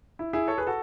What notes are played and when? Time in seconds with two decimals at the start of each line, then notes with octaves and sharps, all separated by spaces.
0.19 E4
0.33 E4 G#4
0.48 A4 C#5
0.58 G#4 B4
0.67 F#4 A4